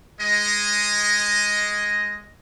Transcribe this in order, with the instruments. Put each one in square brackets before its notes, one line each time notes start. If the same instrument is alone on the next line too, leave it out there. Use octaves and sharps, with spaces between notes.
[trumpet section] G#3 D#5